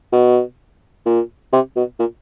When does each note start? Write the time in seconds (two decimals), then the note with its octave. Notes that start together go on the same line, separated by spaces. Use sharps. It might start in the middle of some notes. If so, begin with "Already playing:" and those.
0.13 B2
1.06 A#2
1.53 C3
1.76 B2
1.99 A#2